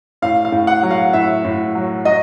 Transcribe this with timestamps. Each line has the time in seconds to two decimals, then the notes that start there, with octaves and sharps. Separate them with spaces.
0.22 A2 F5
0.45 F5
0.52 A2
0.67 F#5
0.83 F#3
0.91 F5
1.13 A2 E5
1.45 A2
1.75 F#3
2.05 F#3 D#5